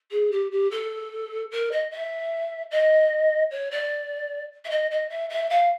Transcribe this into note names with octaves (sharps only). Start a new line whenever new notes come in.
G#4
G4
G4
A4
A#4
D#5
E5
D#5
C#5
D5
E5
D#5
D#5
E5
E5
F5